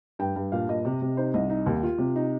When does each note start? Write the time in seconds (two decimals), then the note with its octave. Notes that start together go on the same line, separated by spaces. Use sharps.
0.19 G2 G5
0.36 G2
0.52 A#2 F5
0.69 A#2 D#5
0.85 C3
1.02 C3
1.17 D#4 C5
1.34 C2 D#5
1.50 D#4
1.66 D#2
1.83 F4
1.98 C3
2.16 D#4